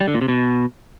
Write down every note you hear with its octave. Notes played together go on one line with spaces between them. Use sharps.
G3
D3
A#2
C3
B2